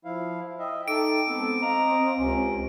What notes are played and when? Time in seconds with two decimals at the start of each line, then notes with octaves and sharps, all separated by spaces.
0.05 F3 E4 F5
0.59 D#5 E5 G5
0.88 D#4 A4 D6 D7
1.27 G#3 B3 C4 A4
1.61 D#5 F5 A#5
2.18 C#2 C3 C#4